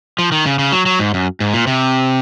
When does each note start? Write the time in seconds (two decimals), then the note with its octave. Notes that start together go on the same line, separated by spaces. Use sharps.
0.19 F3
0.32 D#3
0.46 C#3
0.59 C#3
0.72 F#3
0.86 F#3
0.99 G#2
1.14 F#2
1.40 G#2
1.53 A#2
1.67 C3